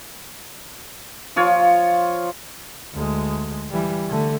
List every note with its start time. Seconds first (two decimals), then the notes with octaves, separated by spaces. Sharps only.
1.36 F3 F4 C#5
2.93 D2 G#3
3.70 E3 G3
4.09 D3 A3